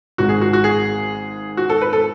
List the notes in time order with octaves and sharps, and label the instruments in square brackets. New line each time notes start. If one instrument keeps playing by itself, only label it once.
[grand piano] G#1 G#2 G#3 F#4
G#4
F#4
F#4
G#4
F#4
A4
B4
A4